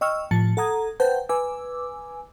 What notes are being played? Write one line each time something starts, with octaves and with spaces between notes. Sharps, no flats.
D#5 G5 C#6 E6 F6
A2 F3 A5 A6 C#7
A4 F#5 A#5 D#6 G#6
B4 C5 F#5 G5 A5 G6
B4 G#5 D6 E6